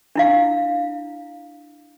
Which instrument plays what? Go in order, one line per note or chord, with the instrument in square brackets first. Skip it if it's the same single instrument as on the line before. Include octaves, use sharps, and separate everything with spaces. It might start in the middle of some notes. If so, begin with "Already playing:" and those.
[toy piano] D4 E4 F5